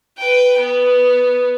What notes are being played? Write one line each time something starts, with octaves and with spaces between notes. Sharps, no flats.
B4 G5
B3